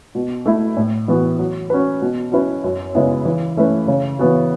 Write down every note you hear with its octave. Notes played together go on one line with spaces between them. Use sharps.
B2
A3 E4
A2
E3 B3 F#4
F#3
C#4 F#4 B4
B2
F#3 C#4 E4 B4
F#2
C#3 G#3 B3 E4
E3
A3 C#4 E4 B4
C#3
E3 B3 F#4